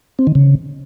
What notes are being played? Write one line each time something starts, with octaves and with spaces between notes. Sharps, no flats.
C4
D#3
C#3